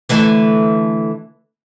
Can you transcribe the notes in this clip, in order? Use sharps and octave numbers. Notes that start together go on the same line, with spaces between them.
D3 E3 A3